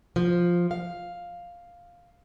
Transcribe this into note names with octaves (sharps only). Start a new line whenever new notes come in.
F3
F5